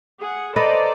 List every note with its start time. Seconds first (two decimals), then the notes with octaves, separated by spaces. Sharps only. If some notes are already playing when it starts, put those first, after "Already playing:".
0.20 G#4 F#5
0.56 A4 B4 C5 D5 D#5 A#5